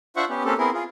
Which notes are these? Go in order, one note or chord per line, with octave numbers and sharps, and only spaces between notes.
D4 F4 C5 E5 F#5 C#6
B3 C#4 G4
A#3 C4 C#4 G4 A4
B3 C4 E4 G#4 A#4
F4 G#4